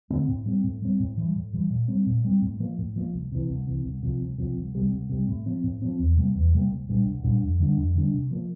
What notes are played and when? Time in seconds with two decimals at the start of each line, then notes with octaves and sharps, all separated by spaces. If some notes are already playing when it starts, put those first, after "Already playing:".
0.10 D3 A3 C4
0.28 A2
0.46 G3 C4
0.64 A2
0.82 G3 C4
1.00 A2
1.18 E3 G3
1.35 A2
1.53 E3 G3
1.70 A#2
1.88 G3 C4
2.06 A#2
2.25 G3 C4
2.42 A2
2.60 F3 A#3
2.78 A2
2.96 F3 A#3
3.14 C2
3.32 C3 E3
3.49 C2
3.67 C3 E3
3.85 C2
4.03 C3 F3
4.21 C2
4.38 C3 F3
4.56 C2
4.75 C3 G3
4.92 C2
5.10 C3 G3
5.28 A2
5.46 F3 C4
5.63 A2
5.82 F3 C4
5.99 E2
6.17 C3 G3 A#3
6.35 E2
6.53 C3 G3 A#3
6.71 C2
6.89 A#2 G3 D4
7.06 C2
7.24 A#2 G3 D4
7.42 F2
7.60 D3 G3 D4
7.77 F2
7.96 D3 G3 D4
8.14 C3
8.31 F3 A#3